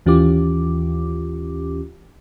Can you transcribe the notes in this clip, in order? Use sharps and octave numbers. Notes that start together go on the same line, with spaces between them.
D#2 E3 C#4 F4 G4 D6